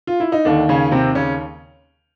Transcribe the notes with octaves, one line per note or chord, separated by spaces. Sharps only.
F4
E4
D#4
D#2 D3 D#3 D4
C#3 C#4
C3 C4
C#3 C#4